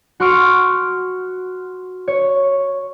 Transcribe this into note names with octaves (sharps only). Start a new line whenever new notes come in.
F#4 C6 C#6 F6 D7
C#5